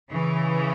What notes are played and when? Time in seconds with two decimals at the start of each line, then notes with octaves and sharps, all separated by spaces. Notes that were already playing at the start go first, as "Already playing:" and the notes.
0.11 C#3 E3